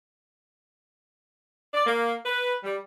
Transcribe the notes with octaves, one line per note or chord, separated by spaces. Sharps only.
D5
A#3
B4
G3